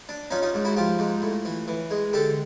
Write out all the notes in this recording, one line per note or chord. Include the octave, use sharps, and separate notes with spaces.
D4
C#4 D#4 F4
D#4 F4
G#2
E4 F#4
F3 F4 G4
G#2
A2
E3
E3
G#3
D3 G4 A4